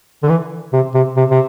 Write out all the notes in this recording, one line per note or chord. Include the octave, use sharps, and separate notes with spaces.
D3
E3
C3
C3
C3
C3